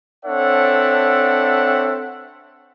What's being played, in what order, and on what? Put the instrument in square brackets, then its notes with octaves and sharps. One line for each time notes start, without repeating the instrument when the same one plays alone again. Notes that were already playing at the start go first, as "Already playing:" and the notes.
[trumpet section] C4 D4 A4 C#5 E5 F#5